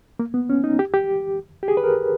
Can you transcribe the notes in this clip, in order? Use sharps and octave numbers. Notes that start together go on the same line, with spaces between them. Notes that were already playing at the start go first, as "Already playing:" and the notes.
A#3
B3
C#4
D#4
G4
G4
G4
G#4
B4
A#4